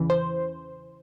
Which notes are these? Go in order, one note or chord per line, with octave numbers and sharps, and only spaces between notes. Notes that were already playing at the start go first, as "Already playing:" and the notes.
Already playing: E2 C#3 E3
C5